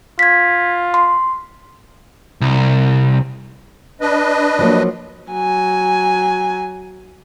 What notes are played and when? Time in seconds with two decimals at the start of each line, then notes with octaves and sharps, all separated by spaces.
0.19 F4 G#6 B6
0.94 C6
2.41 C2
4.01 D4 B4 D#5
4.59 F3 F#3 A#3
5.31 F#3 G#5